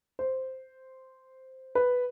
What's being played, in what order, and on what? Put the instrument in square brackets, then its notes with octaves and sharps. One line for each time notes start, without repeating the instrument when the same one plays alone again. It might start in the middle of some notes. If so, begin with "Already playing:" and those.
[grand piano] C5
B4